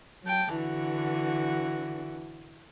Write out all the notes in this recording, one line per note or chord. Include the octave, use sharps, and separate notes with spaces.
F#3 G5 A5
D3 E3 F#4